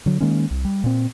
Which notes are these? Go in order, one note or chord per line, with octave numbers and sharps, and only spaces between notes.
D3 F#3
D#3 G#3 A#3 C#4
C2
G3
A#2 C4